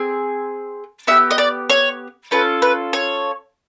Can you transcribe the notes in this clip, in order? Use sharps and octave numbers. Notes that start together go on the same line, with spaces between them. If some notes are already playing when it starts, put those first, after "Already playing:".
Already playing: C4 G#4
B3 E4 G4 E5
D#5
D5
C#5
C#4 F4 A4 B4
B4
C#5